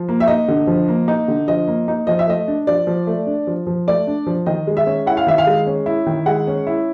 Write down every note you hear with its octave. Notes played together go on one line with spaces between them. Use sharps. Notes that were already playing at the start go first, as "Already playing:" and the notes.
Already playing: F3
A#3
E5
D#4 D#5
D3
F3
A#3
D#4
D3
F3 D#5
A#3
D#4
F3 D#5
E5
A3 D#5
D4
F3 D5
F3
A3
D4
F3
F3
A3 D5
D4
F3
D#3 D#5
G#3
E5
C#4
E4 F#5
F5
D#3 E5
F5
G#3
C#4
E4
D#3
G#3 F#5
C#4
E4